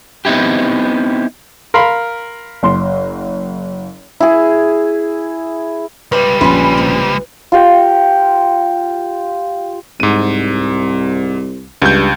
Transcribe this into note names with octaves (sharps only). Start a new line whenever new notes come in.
B3 C4 D#4 E4 G4
A#4 F5 B5 C6
F#1 C6
E4 G#4
C#2 G3 B4 C#5
A#1 C#4 G#4 B4 G#5 C6
D#2 A2 C3
F4 G4 F5 G5
C2 G#2 D#7
C#2 G2 G6